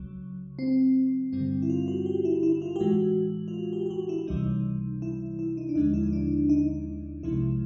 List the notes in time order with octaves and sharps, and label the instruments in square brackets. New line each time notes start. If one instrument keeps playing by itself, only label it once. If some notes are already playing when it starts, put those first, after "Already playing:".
Already playing: [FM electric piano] C#2 C#3 F#3
C4
G2 D3 G3 C4
E4
F4
F#4
G4
E4
E4
F4
G4
A2 E3 G#3 F#4
F4
F#4
G4
G4
F#4
E4
C#2 C3 E3 G3 D#4
E4
E4
D#4
D4
D#2 D3 F3 G#3 D#4
E4
D#4
D4
D#4
C2 C3 F3 G#3 E4